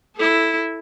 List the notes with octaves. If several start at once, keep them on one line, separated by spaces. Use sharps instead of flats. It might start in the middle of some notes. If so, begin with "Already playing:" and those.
E4 A4